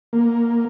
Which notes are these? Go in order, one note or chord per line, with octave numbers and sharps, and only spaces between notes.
A#3